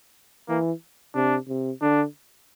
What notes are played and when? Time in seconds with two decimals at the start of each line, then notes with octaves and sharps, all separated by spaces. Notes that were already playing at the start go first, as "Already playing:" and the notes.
0.48 E3 A#3
1.15 C3 D4
1.48 C3
1.82 D3 D4